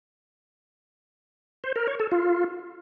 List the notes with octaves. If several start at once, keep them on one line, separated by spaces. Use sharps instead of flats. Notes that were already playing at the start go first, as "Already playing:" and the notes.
C5
A#4
C#5
A4
F4